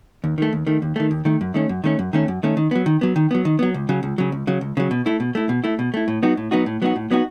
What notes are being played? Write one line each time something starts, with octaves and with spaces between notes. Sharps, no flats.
D#2
D#3 A3
D#2
D#3 A3
D#2
D#3 A3
D#2
D#3 A3
F#2
D#3 A3 C#4
F#2
D#3 A3 C#4
F#2
D#3 A3 C#4
F#2
D#3 A3 C#4
D#3
F#3 B3
D#3
F#3 B3
D#3
F#3 B3
D#3
F#3 B3
C#2
C#3 F#3
C#2
C#3 F#3
C#2
C#3 F#3
C#2
C#3 F#3
B2
A3 E4
B2
A3 E4
B2
A3 E4
B2
A3 E4
A2
F#3 B3 D#4 F#4
A2
F#3 B3 D#4 F#4
A2
F#3 B3 D#4 F#4
A2
F#3 B3 D#4 F#4